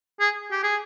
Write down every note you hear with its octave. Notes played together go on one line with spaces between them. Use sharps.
G#4
G4
G#4